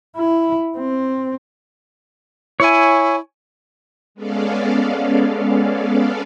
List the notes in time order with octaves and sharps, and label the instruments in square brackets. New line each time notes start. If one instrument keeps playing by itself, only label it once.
[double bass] E4
C4
[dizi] E4 [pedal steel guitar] C#5 G#5
[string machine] G#3 B3 C#4 A4 D5 F5